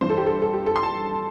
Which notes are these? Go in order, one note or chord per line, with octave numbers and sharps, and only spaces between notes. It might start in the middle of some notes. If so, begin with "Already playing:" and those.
G2 E3 C5
A4
G4
A4
A4
G4
A4
C6
A5